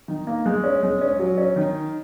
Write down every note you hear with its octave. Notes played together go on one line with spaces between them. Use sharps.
D#3
A#3
G#3
C#4
G#3
C#4
F#3
C#4
D#3